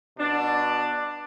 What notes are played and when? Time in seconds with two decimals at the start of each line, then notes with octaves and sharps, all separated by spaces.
0.17 B2 D4